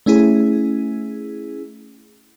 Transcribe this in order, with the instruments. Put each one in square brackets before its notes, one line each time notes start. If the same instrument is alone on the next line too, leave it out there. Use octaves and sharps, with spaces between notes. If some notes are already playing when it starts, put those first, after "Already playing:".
[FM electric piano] A3 C#4 E4 G#4